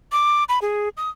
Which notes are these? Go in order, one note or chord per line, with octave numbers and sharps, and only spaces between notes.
D6
B5
G#4
D#6